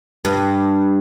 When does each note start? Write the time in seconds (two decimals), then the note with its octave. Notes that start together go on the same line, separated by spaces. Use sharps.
0.25 G2